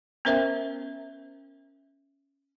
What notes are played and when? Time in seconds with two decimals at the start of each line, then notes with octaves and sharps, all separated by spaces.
0.25 B3 C#4 A#4 C5 E5